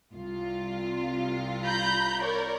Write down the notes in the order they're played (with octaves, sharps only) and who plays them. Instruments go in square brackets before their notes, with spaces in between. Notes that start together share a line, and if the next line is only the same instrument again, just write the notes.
[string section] C2 F4
[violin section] A#5 B5 G6
A#4 C#5 D5